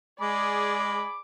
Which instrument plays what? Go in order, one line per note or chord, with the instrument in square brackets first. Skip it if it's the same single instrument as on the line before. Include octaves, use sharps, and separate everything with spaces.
[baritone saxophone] G#3 [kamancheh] G#4 D5 [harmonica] B5 [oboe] D6